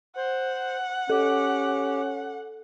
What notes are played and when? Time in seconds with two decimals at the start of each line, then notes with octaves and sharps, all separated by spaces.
0.16 C5 F#5
1.10 C#4 G4 A4